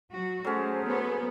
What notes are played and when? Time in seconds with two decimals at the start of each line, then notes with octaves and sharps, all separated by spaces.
0.14 F#3 F#4
0.45 F#3 A3 C#4 G#4 A4 C5
0.84 B3